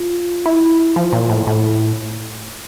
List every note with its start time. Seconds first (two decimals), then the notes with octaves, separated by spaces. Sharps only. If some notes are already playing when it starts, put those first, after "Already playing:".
Already playing: F4
0.46 E4
0.96 F3
1.13 A#2
1.29 A2
1.47 A2